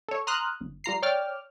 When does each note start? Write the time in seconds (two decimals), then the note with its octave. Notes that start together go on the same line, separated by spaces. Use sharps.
0.08 A4 C#5
0.27 A#5 C6 D#6 F6 F#6
0.61 G1
0.84 G3 F4 A#5 C7
1.02 C#5 D5 G5 D6 F6